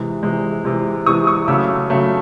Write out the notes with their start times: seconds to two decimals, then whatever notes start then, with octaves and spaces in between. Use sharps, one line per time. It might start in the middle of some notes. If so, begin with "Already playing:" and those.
Already playing: C3 E3 G#3
0.23 C3 E3 G#3
0.65 C3 E3 G#3
1.06 C3 E3 G#3 C#6 D#6
1.27 C#6 D#6
1.48 C#3 F#3 A3 D6 E6
1.90 C#3 F#3 A3